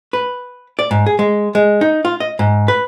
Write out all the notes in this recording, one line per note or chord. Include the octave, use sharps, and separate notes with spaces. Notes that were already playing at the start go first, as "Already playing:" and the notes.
B4
D5
G#2
G#4
G#3
G#3
D#4
F4
D#5
G#2
B4